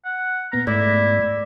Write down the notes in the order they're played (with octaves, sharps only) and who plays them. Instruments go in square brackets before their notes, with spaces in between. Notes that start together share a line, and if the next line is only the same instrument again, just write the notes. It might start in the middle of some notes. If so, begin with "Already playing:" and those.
[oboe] F#5
[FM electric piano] A#2 B3 F6 [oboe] A#5
[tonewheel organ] G#2 [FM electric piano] A3 [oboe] E4 [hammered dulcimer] D5